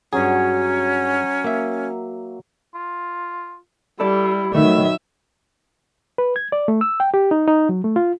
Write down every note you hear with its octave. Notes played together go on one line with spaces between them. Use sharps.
G2 F#3 C#4 G#4
A#3 E5
F4
G3 E4 A4 D5
D#3 F#3 A3 B4 E5
B4
G#6
D5
A3
E6
G5
G4
D#4
D#4
F#3
A3
F4